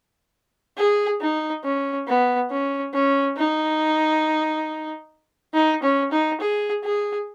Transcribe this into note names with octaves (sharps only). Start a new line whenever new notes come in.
G#4
D#4
C#4
B3
C#4
C#4
D#4
D#4
C#4
D#4
G#4
G#4